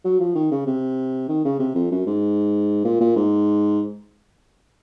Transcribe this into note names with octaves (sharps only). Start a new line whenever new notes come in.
F#3
F3
D#3
C#3
C3
D#3
C#3
C3
F2
F#2
G#2
A#2
A#2
G#2